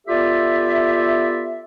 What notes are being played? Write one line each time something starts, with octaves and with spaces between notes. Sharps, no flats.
B3 F4 G4 A4 D5 E5